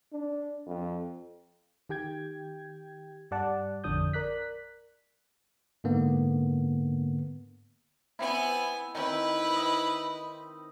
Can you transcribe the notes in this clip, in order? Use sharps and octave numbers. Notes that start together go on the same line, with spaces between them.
D4
F2
D#3 G4 G5 G#6
G2 G3 D5 F#5 A5
A1 F2 D3 D4 D#6 G6
A#4 D5 F#6 B6
G#2 D3 A#3 B3
B3 C4 E4 G#5
D#3 C4 E4 B4
D#5